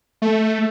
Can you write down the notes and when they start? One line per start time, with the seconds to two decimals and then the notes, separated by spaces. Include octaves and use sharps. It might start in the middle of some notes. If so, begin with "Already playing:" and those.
0.22 A3